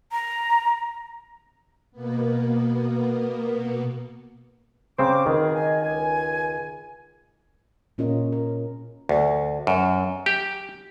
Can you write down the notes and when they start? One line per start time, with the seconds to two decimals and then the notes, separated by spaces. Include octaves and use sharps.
0.12 A#5
1.92 B2 A#3 B3
4.98 C#3 C4 C5 D6
5.26 C#2 B2 D#3 G#4
5.54 D#5 G#5
5.82 C#2 G#5
7.98 A#2 C#4 F4 A#4 D#5
8.32 A#4
9.09 D2
9.67 F#2
10.26 G4